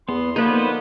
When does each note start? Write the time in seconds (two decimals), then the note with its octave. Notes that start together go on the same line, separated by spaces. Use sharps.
0.09 E2 B3 C6
0.36 D3 F3 A#3 B3 D#4 B4 C5